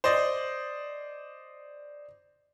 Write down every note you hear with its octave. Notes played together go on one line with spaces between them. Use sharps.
C5 D5 D#5